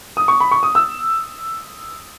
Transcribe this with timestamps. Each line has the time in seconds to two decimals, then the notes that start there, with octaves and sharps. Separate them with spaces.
0.17 D#6
0.28 C#6
0.40 B5
0.51 C#6
0.63 D#6
0.75 E6